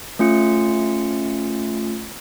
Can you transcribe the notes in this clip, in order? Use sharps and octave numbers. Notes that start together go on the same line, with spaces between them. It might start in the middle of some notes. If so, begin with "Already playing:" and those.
A3 C#4 F4 C#7